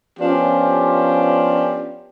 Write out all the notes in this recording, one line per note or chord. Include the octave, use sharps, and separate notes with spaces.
F3 B3 C#4 D4 F4 G4